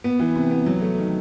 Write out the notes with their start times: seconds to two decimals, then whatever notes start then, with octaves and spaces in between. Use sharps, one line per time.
0.04 B3
0.20 E3
0.35 C3
0.51 B3
0.66 F#3
0.82 A3
0.98 D#3